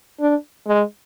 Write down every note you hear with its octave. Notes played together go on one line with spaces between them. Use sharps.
D4
G#3